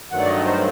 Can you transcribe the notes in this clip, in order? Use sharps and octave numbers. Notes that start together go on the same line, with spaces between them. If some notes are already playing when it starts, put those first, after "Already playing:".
G2 D#3 F#3 A3 F#5
D5
D#5
C5